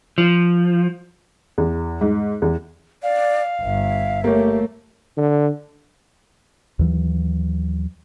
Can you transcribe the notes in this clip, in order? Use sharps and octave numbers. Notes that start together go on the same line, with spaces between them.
F3
E2
G#2
E2
D5 F5
G1 E5
A3 A#3 G4 C#5
D3
D#2 E3 F#3